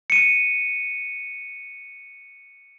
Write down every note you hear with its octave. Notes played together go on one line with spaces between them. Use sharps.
C#7 D#7